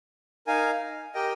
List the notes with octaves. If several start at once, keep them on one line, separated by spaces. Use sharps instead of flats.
D#4 A#4 F5 G#5
G4 A#4 D#5 G5